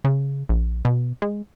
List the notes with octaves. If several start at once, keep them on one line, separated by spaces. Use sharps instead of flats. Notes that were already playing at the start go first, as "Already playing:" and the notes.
C#3
A#1
B2
G#3